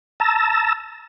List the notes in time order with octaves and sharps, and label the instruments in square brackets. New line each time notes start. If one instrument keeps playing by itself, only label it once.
[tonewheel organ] A5 A#5 E6